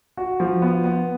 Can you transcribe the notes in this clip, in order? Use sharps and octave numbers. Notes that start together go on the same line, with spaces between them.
F#4
F3
B3
B3